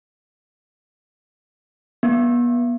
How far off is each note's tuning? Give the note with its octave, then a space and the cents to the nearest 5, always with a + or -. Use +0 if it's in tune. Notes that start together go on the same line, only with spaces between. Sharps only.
B3 -40